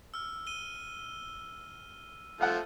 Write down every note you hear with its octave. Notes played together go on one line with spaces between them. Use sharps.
E6 F6
D#7 G7
F3 A3 F5 F#5